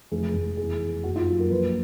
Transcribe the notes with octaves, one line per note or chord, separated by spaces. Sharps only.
F1 G#4
F1
E2 G#4
E2
F#1 F#4
F4
F#3
A#4
A#1 B4